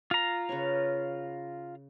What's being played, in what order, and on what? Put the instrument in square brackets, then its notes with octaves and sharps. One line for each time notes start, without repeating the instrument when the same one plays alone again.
[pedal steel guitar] F4 A#5
[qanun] C#3 B4 C#5